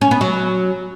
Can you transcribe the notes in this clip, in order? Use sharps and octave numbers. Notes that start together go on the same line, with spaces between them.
C#4
B3
F#3